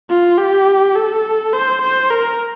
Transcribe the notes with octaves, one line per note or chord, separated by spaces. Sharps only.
F4
G4
A4
C5
C5
A#4